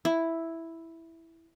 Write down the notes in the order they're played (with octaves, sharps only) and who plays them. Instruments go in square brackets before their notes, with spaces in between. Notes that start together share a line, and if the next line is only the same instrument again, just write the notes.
[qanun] E4